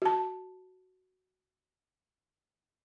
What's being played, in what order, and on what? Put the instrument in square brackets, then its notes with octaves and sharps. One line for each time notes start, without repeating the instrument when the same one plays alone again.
[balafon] F#4 A5